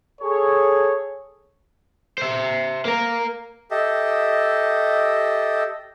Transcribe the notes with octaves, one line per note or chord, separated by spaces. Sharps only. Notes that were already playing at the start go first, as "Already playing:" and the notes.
G#4 A4 C#5
C5 E5
A#3 A#4
G4 A4 D#5 E5